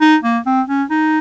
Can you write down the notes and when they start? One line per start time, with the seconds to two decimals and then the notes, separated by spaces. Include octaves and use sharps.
0.01 D#4
0.23 A#3
0.46 C4
0.68 C#4
0.90 D#4